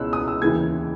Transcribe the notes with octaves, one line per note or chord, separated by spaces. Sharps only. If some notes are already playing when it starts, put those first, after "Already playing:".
Already playing: C#2 B2 C#4 E4 E6 F#6
D#6
E6
D#2 C#3 E3 G#6